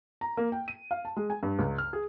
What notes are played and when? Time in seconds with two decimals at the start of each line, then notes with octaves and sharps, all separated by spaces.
0.21 A#5
0.37 A#3
0.52 G5
0.68 D#7
0.91 F5
1.05 A5
1.17 G#3
1.30 G#5
1.43 G2
1.59 C#2
1.78 F6
1.93 G#4